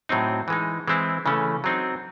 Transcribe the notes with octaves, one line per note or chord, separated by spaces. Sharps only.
A2 F#3 C4 D#4
E3 G#3 D#4
E3 G#3 C4 E4
C#3 E3 A3 C#4
F#3 C4 D#4